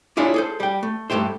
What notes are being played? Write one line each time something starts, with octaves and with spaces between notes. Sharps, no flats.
D4 E4 F4 G#4 C#5 D5
G#4 A4 C5
G3 G5
A3
G2 C3 A3 G4 C5